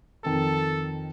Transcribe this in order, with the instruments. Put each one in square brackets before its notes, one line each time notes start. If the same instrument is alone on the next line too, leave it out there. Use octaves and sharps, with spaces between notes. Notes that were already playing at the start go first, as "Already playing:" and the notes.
[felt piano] F2 D#3 [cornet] A4